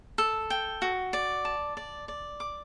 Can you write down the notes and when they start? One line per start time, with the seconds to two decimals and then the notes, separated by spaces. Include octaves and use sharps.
0.18 A4
0.50 G5
0.82 F#4
1.13 D5
1.45 A5
1.77 D5
2.08 D5
2.40 D6